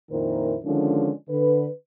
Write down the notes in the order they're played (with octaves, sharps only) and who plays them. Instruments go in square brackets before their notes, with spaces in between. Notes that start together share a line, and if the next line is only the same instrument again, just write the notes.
[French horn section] F2 A#2 D#3 E4 A#4 C5
D3 D#3 F3 G#3 C#4 D4
D3 B4